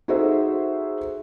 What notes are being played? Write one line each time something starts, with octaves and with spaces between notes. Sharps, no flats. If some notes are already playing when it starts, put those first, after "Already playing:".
D#4 F#4 G#4 A4 C5 E5